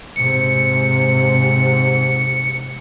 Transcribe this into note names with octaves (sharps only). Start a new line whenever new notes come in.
G#2 C3 C#7